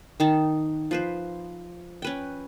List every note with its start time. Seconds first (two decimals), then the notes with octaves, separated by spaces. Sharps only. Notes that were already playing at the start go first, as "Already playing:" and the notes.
0.20 D#3 D#4 A5
0.91 F3 B4 C5
2.02 C#4 B4 G5